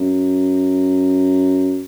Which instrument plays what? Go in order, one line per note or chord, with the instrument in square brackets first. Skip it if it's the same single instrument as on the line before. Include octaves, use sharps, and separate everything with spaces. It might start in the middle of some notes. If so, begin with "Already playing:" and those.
Already playing: [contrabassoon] F#2